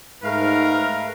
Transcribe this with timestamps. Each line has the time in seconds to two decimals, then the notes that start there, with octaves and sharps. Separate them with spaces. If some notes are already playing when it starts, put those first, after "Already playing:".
0.24 G#2 A3 A#4 B4 F5